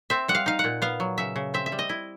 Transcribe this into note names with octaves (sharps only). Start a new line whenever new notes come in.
C4 E5
G3 F#5
F5
D#4 F5
F#5
A#2
B3 F5
F#3
C#3 E5
C#3
C4 E5
E5
G3
D#5
E4